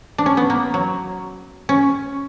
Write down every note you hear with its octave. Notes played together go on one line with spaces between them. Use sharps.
D4
C#4
B3
A#3
F#3
C#4